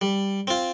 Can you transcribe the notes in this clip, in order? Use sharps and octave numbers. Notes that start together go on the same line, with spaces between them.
G3
C4 F4